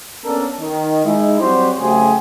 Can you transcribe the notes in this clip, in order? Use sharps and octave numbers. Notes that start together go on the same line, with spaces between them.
A#3 B3 C#4 D4 A4 A#4
D#3
G#3 D#4 E4
F#3 G3 C4 F#4 G4 C5
C#3 F#3 A3 G4 G#4 C5